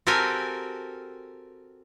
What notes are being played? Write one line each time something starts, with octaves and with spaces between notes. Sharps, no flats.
C4 F#4 G4 A4 A#4 G#5